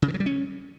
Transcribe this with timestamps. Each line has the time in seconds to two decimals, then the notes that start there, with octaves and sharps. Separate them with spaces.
0.02 C#3
0.08 D#3
0.14 F#3
0.20 G3
0.26 C#4